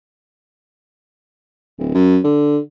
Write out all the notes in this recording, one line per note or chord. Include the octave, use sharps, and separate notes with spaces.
D1
F#2
D3